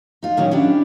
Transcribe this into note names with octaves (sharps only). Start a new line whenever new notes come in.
D#4 F4
A#2 D#3 F#3 C#4 C#5
C#4 D4 E4 G4 D5 F#5